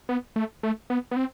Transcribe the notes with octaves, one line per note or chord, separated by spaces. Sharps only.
B3
A3
A3
B3
B3
C4